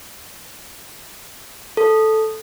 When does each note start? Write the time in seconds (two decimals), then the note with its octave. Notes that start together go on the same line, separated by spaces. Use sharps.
1.77 A4